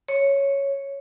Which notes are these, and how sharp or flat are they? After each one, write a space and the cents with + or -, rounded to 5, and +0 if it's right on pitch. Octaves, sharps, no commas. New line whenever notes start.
C#5 +0